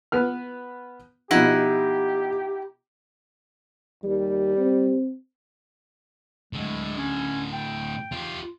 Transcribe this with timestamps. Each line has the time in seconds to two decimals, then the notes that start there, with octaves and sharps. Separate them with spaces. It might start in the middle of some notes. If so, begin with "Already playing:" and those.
0.12 B3 B4 F6
1.31 B2 F3 D#4 E4 G4 F#5
4.04 D#2 G3
4.57 C4
6.53 A2 D3 G#3
6.97 C#4
7.53 G5
8.12 F4 G4